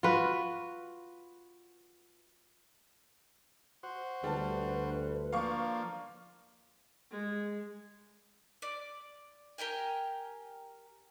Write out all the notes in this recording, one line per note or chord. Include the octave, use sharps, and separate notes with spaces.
F4 F#4 B4
F#4 C5
D2 G3 B4 A5
F3 A#3 D4 F5 C#6
G#3
D5
G4 A#4 G5 G#5